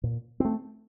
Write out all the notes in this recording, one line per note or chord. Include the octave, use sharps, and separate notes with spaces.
A#2
A3 C4